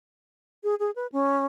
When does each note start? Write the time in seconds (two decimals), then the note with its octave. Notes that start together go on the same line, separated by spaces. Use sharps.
0.63 G#4
0.79 G#4
0.96 B4
1.12 C#4